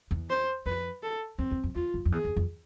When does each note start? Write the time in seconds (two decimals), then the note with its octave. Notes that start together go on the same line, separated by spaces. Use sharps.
0.11 E2
0.30 C5
0.66 F2 B4
1.03 A4
1.39 E2 C4
1.51 E2
1.64 F2
1.75 E2 F4
1.94 F2
2.05 F2
2.12 E2 G#4
2.25 E2
2.36 F2